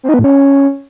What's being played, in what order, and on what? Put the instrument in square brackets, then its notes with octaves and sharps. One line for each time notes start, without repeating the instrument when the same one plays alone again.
[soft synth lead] C4
D#4
B3
A2
C#4